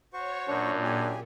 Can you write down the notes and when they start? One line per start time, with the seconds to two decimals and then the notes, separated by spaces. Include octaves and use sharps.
0.13 F#4 C5 C#5 C#6
0.48 F#2 A#2 D4
0.83 G4 G#4 G#5